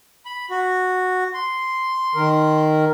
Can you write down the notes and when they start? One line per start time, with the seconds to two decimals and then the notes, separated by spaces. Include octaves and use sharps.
0.26 B5
0.51 F#4
1.34 C6
2.15 D#3 A#4